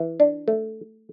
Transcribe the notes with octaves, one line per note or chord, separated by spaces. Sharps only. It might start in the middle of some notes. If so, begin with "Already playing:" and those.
Already playing: E3
D4
A3